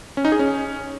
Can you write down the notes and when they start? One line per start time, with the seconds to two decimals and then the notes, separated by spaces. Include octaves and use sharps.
0.17 C#4
0.25 D#4
0.32 G#4
0.39 C#4